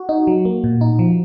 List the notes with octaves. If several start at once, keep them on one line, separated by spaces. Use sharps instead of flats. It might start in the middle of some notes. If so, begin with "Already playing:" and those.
Already playing: F#4
D#4
F#3
A#3
A#2
D#4
F3